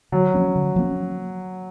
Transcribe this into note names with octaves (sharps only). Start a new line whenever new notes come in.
D3 F#3
F3 A#3 C#4
D3
F3 A#3 C#4